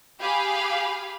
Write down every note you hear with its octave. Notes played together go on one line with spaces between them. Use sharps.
G4 G#4 F5 B5